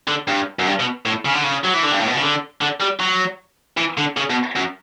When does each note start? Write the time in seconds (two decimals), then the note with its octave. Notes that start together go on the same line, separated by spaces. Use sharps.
0.08 D3
0.28 G2
0.59 F#2
0.67 G2
0.80 B2
1.06 A2
1.25 C#3
1.34 D3
1.44 C#3
1.64 F#3
1.74 E3
1.84 D3
1.92 G2
2.00 A2
2.07 B2
2.15 C#3
2.22 D3
2.61 D3
2.81 G3
3.00 F#3
3.77 E3
3.98 D3
4.17 C#3
4.30 B2
4.56 F#2